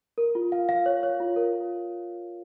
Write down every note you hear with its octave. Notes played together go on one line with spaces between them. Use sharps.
A#4
F4
F5
F5
C#5
C#5
F4
A#4